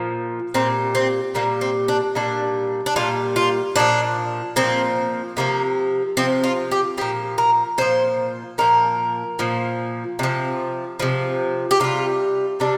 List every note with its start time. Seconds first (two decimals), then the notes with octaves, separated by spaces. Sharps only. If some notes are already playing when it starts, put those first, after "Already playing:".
Already playing: A#2 F3
0.54 A#2 G3 C4
0.95 C4
1.35 A#2 G3 A#3
1.61 C4
1.88 D4
2.15 A#2 G3 D4
2.86 D4
2.96 A#2 G3 F4
3.36 F4
3.76 A#2 F3 D4
4.56 A#2 F3 C4
5.37 C3 F3 A#3
6.17 C3 F3 C4
6.44 F4
6.71 G4
6.97 A#2 F3 G4
7.38 A#4
7.78 A#2 F3 C5
8.58 A#2 F3 A#4
9.39 A#2 F3
10.19 C3 F3
11.00 C3 F3
11.71 G4
11.80 C3 G3 F4
12.60 C3 G3 D4